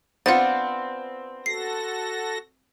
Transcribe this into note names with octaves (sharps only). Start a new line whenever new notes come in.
B3 C4 D4 F4 F#5 A6
F#4 A4 A#6 C7